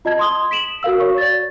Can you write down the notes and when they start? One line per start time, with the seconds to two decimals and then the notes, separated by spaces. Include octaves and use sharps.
0.05 F4 D#5 A5 G#6
0.19 C6 D#6 G7
0.51 B6 D7 E7 F#7
0.83 F#4 A#4 F5 E6
1.00 F#4 C#5 C#6
1.18 D5 A6